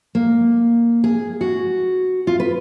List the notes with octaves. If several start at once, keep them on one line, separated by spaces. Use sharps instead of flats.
A#3
G#4
F#4
F4
B4